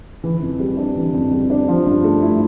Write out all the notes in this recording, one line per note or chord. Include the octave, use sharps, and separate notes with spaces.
E3
F2
G3
D4
E3
F2
G3
D4
F3
G2
A3
E4